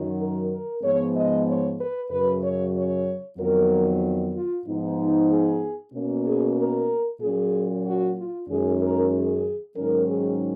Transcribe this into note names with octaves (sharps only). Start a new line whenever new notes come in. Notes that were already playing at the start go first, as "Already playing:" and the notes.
Already playing: F#2 D#3 F#3
A#4
A#4
G#2 F3 G#3 B3 C#5
D#5
C#5
B4
F#2 C#3 F#3 B4
C#5
C#5
F2 D#3 F#3 B3 A#4
F4
G#2 F3 B3 D#4
G#4
B2 A#3 C#4
G#4
A#4
A#2 F#3 C#4 G#4
F#4
F4
F#2 D#3 G#3 C#4 G#4
A#4
G#4
G#2 D#3 F#3 C#4 A#4
G#4